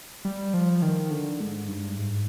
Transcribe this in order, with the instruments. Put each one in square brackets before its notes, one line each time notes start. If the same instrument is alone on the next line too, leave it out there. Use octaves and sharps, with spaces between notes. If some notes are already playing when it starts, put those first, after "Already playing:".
[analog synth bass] G3
F3
D#3
D3
G#2
G2
G#2